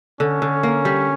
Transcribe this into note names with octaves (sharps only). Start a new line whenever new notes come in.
D3 C#4
D3
A#3
G3